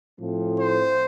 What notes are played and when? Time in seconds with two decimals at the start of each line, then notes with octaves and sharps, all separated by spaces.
0.20 A2 F3 A3 C4
0.58 C5